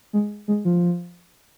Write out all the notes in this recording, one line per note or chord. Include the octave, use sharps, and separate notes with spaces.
G#3
G#3
F3